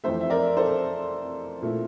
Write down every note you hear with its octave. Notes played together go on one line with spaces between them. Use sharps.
F2 E3 A3 C5 E5
E5
A#4 D5
A4 C5
A#2 A3 E4